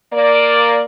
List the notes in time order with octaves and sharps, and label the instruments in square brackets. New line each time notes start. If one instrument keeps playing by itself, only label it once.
[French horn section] A#3 D5